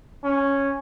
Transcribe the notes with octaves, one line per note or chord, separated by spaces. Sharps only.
C#4